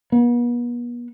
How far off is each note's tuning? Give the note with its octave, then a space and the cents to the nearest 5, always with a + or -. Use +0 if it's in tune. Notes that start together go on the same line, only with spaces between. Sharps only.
B3 -40